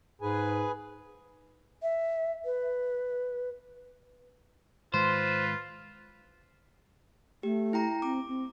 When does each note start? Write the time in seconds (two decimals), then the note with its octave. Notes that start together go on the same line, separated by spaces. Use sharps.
0.22 G#2 G#4 B4 G#5
1.83 E5
2.45 B4
4.94 G#2 D#3 G#3 F4 B4 C5
7.43 A3 G4
7.73 E4 G5 A#5
8.02 C4 D6
8.28 C4